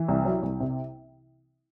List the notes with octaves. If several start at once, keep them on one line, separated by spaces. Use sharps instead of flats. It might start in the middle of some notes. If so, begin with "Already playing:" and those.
Already playing: E3
C2
F#3
C2
C3